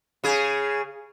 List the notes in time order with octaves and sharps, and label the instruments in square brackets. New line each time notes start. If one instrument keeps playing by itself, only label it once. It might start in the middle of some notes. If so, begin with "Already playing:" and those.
[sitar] C#3 G#4